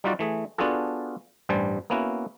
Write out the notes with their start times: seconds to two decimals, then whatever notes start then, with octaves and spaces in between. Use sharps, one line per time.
0.04 G3 D#4 F4 F#4 D5
0.19 E3 A3 G#4
0.58 B3 D4 F4 F#4 G#4 A4
1.49 A1 G2 G3 C5 G#5 A5
1.90 A#3 B3 C#4 E4 F#4